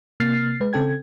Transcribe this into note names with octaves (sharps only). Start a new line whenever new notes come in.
C3 A#3 F6 A6 C7
G#3 B4
C#3 C4 A4 G5 G#6